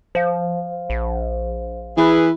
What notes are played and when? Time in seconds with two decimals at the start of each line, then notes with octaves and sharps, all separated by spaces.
0.15 F3 C5 F5
0.90 A#1
1.97 E3 E4 G#4 B4